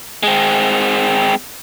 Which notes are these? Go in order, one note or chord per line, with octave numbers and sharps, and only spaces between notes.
G#3 C4